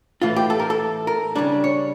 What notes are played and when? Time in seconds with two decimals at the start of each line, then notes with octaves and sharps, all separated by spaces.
0.22 A2 E3 A3 F4
0.36 G4
0.50 A4
0.60 A#4
0.70 A4
1.07 A#4
1.35 C#3 G3 D4
1.64 C#5